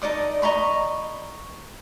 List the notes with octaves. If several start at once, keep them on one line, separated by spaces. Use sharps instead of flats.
D#4 A4 D5 D#6
D#5 A#5 B5 C#6